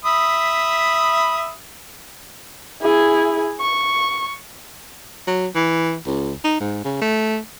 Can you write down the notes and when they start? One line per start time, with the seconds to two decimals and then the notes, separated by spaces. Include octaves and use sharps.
0.05 E5 B5 D#6
2.81 E4 G#4
3.60 C#6
5.28 F#3
5.56 E3
6.07 C#2
6.45 D#4
6.60 G#2
6.85 C#3
7.01 A3